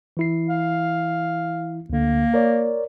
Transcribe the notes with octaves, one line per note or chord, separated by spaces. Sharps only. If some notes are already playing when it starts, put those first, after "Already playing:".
E3 E4 C7
F5
D2 D3 A#3
A#4 C#5 D5